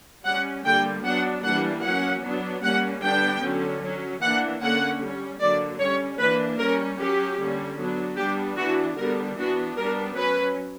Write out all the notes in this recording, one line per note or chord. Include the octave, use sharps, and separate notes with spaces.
G3 C#4 F#5
D3 G3 A#3 G5
F#3 B3 D4 F#5
E3 G3 A#3 D4 F#5
F#3 A#3 C#4 F#5
F#3 B3 D4
G3 A#3 C#4 F#5
D3 G3 B3 D4 G5
D3 F#3 C#4
F#3 C#4
E3 A#3 D4 F#5
D3 A#3 C#4 F#5
G3 C#4
D3 F#3 A#3 D5
G3 C#4 C#5
E3 A#3 D4 B4
G3 C#4 A#4
F#3 C#4 G4
D3 G3 A#3 C#4
F#3 B3 D4
G3 B3 D4 G4
E3 B3 D4 F#4
D3 G3 B3 D4 A#4
E3 B3 D4 F#4
G3 B3 D4 A#4
F#3 C#4 B4